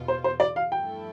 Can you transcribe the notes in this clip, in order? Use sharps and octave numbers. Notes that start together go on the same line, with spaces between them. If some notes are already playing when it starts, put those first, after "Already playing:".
Already playing: E2 B2 B3 F4
C5
C5
D5
F5
G2 F3 A3 E4 A4 G5